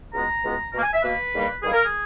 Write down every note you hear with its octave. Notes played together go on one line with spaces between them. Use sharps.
C#2 B2 G#3 B3 A#5
C#2 B2 G#3 B3
B2 A#3 A#5
G#5
E5
B2 A#3 B4
E2 D#3 G3 A#3
E2 D#3 G3 A#3 G#4
A#4
G#4